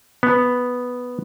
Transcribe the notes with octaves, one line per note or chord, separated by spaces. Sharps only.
B3